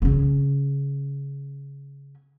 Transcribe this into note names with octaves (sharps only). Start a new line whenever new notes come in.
C#3 C#4